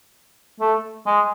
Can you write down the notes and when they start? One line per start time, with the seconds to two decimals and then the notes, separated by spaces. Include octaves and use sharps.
0.60 A3
1.06 G#3